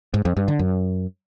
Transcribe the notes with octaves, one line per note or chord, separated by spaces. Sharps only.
G#2
F2
G2
D3
F#2